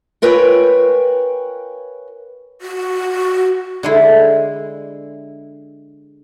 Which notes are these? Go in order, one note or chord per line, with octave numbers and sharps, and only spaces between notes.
F4 A#4 B4 C#5 G5 G#5
F#4
D3 G#3 E4